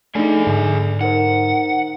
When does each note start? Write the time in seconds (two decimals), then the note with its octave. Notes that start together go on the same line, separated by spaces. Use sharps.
0.15 A3 D4 D#4 G#4 A4 D5 G#5
0.47 G#2 D3
1.01 D#4 A#4 C5 F#5